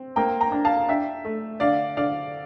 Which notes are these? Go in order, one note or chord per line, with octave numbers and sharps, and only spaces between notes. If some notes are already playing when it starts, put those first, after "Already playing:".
Already playing: C4
A#3 G5 A#5
G5 A#5
D4
F5 A5
D4 E5 G5
A3
D3 D5 F5
D3 D5 F5